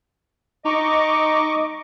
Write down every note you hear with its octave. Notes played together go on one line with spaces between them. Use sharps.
D#4 D#5 C#6 D6